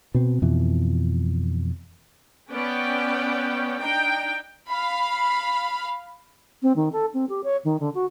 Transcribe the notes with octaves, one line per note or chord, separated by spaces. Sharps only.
B2 C4
F2 B2 E3
B3 C#4 B4 D5 G5
D4 D#4 G5
F5 B5
C4
D#3
A4
C4
G4
C#5
D#3
D3
F#4